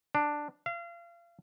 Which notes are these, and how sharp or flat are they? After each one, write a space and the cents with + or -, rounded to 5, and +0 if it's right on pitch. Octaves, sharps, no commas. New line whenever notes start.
D4 +5
F5 -35